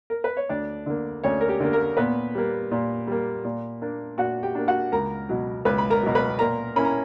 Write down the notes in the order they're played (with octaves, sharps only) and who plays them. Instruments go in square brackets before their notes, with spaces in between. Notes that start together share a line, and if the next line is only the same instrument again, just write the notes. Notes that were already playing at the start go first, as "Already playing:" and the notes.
[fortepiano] A#4
B4
C#5
D2 D4 D5
D3 A#3
D2 C#4 C#5
A#4
G4
D3 A#3
A#3 A#4
A#2 B3 B4
G3 A#3
A#2
G3 A#3
A#2
A#3 D4
A#2 F#4 F#5
G4 G5
A#3 D4
F#4 F#5
C#2 A#4 A#5
B2 F#3
C#2 B4 B5
B5
A#4 A#5
B2 F#3
B4 B5
A#2 A#4 A#5
A#3 C#4 E4 B5
A#5